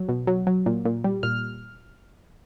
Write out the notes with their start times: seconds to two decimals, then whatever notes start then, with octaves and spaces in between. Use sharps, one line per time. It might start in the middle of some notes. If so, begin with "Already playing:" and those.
Already playing: F#3
0.09 B2
0.27 F#3
0.47 F#3
0.66 A#2
0.85 A#2
1.04 G3
1.23 A#2 F6